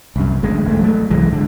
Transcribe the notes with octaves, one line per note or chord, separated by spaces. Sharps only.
C2 F#2
G#1 D2 G#3
E1 A3
F#3 A3
C2 G#2 E3 G#3
D#1 D3